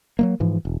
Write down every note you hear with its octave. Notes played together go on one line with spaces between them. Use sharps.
F#3 G#3 A#3
G#2 E3 F3
E1